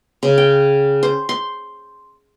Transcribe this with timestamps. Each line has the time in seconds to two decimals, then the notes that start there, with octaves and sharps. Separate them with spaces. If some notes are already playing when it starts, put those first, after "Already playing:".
0.23 C#3
0.38 G5
1.03 C5
1.29 C6